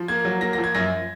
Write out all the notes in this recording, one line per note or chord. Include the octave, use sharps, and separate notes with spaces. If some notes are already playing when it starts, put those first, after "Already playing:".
Already playing: F3
A#3 G#6
F#3
A#3 A#6
A#6
F3
G#6
F#2 A#6